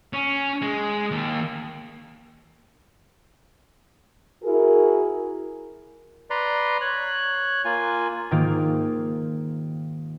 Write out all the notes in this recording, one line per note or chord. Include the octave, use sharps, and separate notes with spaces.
C#4
G#3
D#2
E4 F#4 G#4 A#4
B4 D5 A#5 C6
C#5 F#6
A#3 F4 G#5
G#2 D#3 A#3 F4